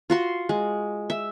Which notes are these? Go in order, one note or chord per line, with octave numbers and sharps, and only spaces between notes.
F4 F#4 C6
G#3
E5